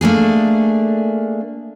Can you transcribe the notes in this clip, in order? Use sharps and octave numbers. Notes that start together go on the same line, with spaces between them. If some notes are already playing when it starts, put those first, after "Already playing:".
A3 A#3 D4 G#4